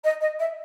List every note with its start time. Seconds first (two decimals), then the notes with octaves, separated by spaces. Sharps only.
0.04 D#5
0.21 D#5
0.39 E5